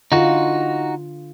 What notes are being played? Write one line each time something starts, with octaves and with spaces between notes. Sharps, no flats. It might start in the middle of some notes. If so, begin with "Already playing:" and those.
D3 D#4 F4 F#4